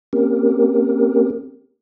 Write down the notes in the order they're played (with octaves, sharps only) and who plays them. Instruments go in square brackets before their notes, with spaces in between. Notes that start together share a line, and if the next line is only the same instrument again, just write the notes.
[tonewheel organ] A#3 C4 C#4 G4 A#4